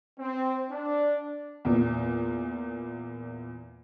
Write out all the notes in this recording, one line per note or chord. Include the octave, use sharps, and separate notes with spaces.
C4
D4
E2 A#2